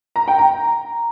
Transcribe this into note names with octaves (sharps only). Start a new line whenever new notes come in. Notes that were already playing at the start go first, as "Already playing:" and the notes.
A#5
G5
A#5